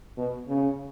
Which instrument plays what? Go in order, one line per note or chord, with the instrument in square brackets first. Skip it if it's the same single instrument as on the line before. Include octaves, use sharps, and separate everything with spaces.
[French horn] B2
C#3